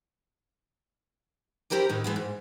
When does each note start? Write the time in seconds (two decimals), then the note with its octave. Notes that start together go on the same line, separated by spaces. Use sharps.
1.70 E4 G4 A#4 C5 D5
1.89 A2 D#3 D#4
2.04 E3 G#3 B3
2.16 G#2